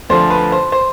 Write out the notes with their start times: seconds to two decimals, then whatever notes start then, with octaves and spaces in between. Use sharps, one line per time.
0.09 D2 D3 F3 C5
0.30 B4
0.52 C5
0.72 C5